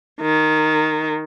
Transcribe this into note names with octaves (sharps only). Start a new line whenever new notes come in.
D#3